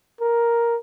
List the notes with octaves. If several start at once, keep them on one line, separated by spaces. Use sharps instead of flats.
A#4